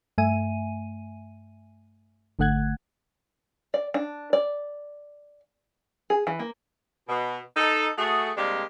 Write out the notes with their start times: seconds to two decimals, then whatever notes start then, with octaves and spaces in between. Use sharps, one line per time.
0.18 G2 A3 E5 G#5 D#7
2.39 G#1 D3 A3 F#5 F#6 G#6
3.74 D5
3.94 D4
4.33 D5
6.10 G#4
6.27 E3
6.39 A#3
7.09 B2
7.57 D#4 A4
7.98 A3 F#4 G#4
8.37 C3 G3 G#3 A#3 D4 G4